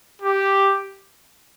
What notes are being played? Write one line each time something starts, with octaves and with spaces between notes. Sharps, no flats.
G4